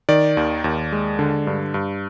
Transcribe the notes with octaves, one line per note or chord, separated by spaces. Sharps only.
D#3 D5
D#2
D#2
G#3
D3
G2
G2